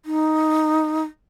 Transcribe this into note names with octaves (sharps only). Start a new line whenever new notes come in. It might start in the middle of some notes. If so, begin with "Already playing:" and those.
D#4